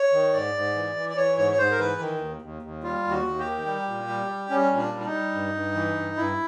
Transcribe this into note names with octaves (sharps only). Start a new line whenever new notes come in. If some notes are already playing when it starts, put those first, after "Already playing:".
Already playing: C#5
D#3
G#2 D5
G#2
E3
E3
D5
E3 C#5
G#2 C#5
C#5
G#2 C5
A#4
E3 B4
D#3
D#2
D#2
D#2
G3 F4
D#2
F#4
D#2
G4
D#3
G3
A#2
G3
G3
G3 C#4
A#2
D4
G3
D4
D#4
G3
G2
G2
E3
G2
G2 E4